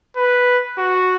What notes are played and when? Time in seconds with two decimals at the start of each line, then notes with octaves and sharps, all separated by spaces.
0.17 B4
0.78 F#4